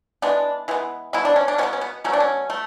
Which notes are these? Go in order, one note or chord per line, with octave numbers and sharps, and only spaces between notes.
E3 G#3 B3 D4
E3 G#3 B3
B2 G#3 B3 E4
D4
C#4
D4
B2 G#3 B3 C#4
C#4
B3
B2 F#3 A3 C#4
D4
C#4
A3